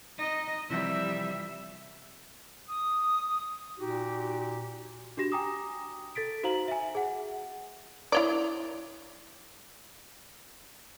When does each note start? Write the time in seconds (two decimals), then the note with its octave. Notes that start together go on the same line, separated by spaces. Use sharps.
0.19 D#4 D#5
0.70 C3 E3 F3 G3 E5
2.69 D#6
3.78 A#2 D#4 F#4 G4
5.17 D4 F#4 G4 A#6 E7
5.32 G5 G#5 A#5 D6 D#6
6.15 A4 A6 B6 D7
6.43 D#4 F#4 C5 F5 A#5 F#7
6.68 E5 G#5
6.95 G#4 F#5
8.12 E4 C#5 D5